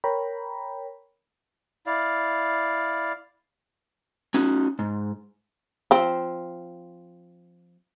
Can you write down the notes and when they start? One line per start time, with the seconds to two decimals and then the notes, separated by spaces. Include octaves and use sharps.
0.04 A#4 C#5 G5 A#5 B5
1.86 E4 D5 F5
4.34 C#4 D#4 F#4
4.79 G#2
5.91 F3 C4